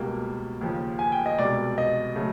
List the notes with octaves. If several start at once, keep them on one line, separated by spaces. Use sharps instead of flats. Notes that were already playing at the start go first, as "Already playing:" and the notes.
Already playing: C#2 B2 G3 A#3
D#2 C#3 F3
G#5
G5
D#5
C2 B2 G#3 D5
D#5
C#3 F#3 A3